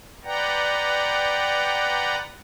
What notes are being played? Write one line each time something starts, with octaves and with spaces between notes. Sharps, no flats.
B4 D5 F#5 G5 A#5